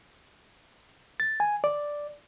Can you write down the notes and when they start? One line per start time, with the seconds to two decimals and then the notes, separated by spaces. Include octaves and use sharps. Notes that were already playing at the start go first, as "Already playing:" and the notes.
1.20 A6
1.40 G#5
1.64 D5